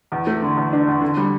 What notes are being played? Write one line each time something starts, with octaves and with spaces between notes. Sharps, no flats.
E2
A3
D3
E2
D4
E2
D3
G3